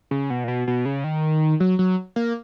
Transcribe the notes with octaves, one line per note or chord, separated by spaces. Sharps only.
C#3
B2
A#2
B2
B2
C#3
D#3
F#3
F#3
A#3